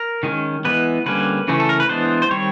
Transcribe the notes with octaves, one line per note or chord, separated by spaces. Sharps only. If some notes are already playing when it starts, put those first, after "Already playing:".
Already playing: A#4
D#3 G#3 C#4
E3 G#3 B3 B4
D3 G3 A#3 C#4 B4
C#3 E3 A3 C#4
A4
A#4
B4
E3 G#3 B3 D4 C5
C5
D#3 G3 C4 C#5